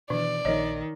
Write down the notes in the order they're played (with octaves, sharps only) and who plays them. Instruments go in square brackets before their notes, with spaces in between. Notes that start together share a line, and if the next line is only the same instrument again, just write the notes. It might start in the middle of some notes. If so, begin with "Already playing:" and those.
[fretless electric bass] B2 E3 [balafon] D#3 D4 [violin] D5
[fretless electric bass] A#1 [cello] D#3 [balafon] C#5 D#5